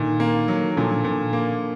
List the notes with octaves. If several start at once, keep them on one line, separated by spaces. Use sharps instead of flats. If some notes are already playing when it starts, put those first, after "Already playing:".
Already playing: A#2 D3 D#3
A#3
F#3
A#2 D3 F3
A#2
A#3